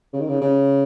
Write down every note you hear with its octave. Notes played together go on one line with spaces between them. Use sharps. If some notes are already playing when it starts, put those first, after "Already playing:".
C#3
D#3
C#3
C#3